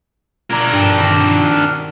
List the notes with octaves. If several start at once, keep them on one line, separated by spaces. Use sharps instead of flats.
D4 A#4 A#5 F6 G#6
G2
D#3 C4
F#4